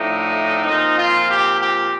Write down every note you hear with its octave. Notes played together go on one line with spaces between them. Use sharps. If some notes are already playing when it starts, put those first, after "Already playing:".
Already playing: A2 F3 A3 D4 D#4
A#2 F3 C4 D#4
F4
G4
G4